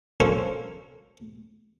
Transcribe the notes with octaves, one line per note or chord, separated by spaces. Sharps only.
C#4 F#4 A4 A#4 C5 F5